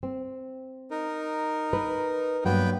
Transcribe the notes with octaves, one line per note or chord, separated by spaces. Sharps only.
C4
D#4 A#4
B4
G2 F#3 A#3 B3 B4 G5